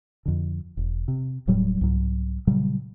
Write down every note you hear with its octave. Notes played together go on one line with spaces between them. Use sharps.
F2 D3
E1
C3
D#1 A2 F#3 G3
C2 G#2 F#3
A#2 C#3 F#3 G3